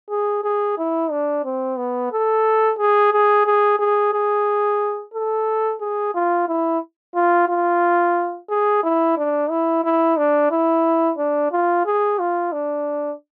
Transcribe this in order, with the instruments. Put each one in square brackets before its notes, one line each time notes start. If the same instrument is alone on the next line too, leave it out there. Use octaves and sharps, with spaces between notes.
[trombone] G#4
G#4
E4
D4
C4
B3
A4
G#4
G#4
G#4
G#4
G#4
A4
G#4
F4
E4
F4
F4
G#4
E4
D4
E4
E4
D4
E4
D4
F4
G#4
F4
D4